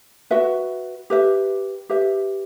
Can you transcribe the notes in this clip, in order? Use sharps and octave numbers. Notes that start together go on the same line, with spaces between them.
F#4 B4 E5
G4 B4 E5
G4 B4 E5